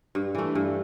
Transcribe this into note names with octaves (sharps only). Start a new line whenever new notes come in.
G2
E3 A3
G2